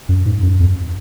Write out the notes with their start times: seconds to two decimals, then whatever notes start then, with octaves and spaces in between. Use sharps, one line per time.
0.09 F#2
0.26 G#2
0.43 F#2
0.60 F2